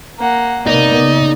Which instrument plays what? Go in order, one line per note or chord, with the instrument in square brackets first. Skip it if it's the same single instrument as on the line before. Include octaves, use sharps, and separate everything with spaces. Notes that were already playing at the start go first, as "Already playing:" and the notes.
[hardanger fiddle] A#3 F#5
[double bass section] C3 A#3 B3 [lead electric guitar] D#4 [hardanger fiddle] D5
[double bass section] C#3